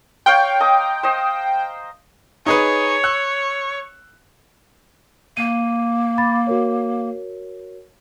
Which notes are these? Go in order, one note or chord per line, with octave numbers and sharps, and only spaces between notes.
C#5 F5 G5 C6
D#5 A#5 D6
C5 D#5
D#4 G#4 B4 C#5
E6 F#6
A#3 D#7
B5 D6 A6
F#4 A#4 C#5